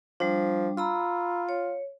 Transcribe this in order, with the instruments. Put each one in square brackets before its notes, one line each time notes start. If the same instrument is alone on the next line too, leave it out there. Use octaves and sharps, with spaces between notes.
[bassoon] F3 [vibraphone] G3 D4
[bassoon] F4 [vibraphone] A#5 B5 E6
[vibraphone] C#5